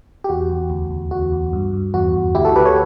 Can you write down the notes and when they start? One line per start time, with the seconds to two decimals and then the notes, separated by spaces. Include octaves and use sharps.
0.24 G4
0.29 E2 F#4
0.50 E2
0.70 D2
0.91 D2
1.11 E2 F#4
1.32 E2
1.53 G2
1.73 G2
1.94 E2 F#4
2.14 E2
2.35 D2 E4 G4
2.45 F#4 A4
2.55 D2 G4 B4
2.65 A4 C#5